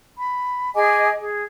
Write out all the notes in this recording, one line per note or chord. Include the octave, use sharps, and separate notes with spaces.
B5
G#4 D#5 G#5 D6
G#4